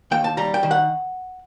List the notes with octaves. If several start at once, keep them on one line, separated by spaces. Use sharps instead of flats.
D#2 G5
A5
G3 A#5
G5
D#3
F#5